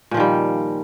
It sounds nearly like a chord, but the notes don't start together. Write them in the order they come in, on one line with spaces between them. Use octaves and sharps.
A#2 F3 D#3 G3